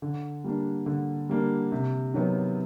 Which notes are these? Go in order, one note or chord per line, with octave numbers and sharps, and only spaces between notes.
D3
G3 A#3 D4
D3
G3 A#3 D4
C3
D#3 F#3 B3